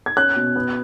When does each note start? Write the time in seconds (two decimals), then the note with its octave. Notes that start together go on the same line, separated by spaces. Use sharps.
0.06 G#6
0.17 C#4 F#6
0.36 B2
0.56 B3